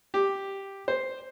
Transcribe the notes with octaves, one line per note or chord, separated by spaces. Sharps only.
G4
C5